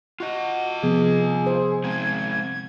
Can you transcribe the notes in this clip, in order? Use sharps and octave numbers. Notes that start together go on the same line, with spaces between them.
F4 F#4 D#5
C3 F3 B3 G#4
C5
G#3 C4 G#6